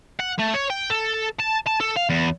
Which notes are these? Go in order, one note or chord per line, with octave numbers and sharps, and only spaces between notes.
F#5
A3
C#5
G5
A4
A5
A5
A4
F5
E2